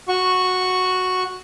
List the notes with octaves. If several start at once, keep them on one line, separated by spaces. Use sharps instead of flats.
F#4 C#6